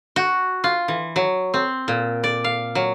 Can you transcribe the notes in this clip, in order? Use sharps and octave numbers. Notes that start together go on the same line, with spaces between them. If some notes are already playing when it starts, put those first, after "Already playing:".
F#4
F4
E3
F#3
C4
A#2
D5
F5
F#3